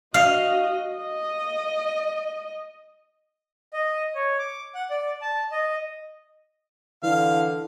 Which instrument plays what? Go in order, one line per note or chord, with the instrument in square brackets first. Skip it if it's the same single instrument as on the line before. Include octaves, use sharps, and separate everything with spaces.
[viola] F#4 D#5 [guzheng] F5
[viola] D#5
[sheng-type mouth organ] D#5
C#5
D6
F#5
D5
A5
D#5
[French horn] D3 [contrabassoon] E3 [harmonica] F5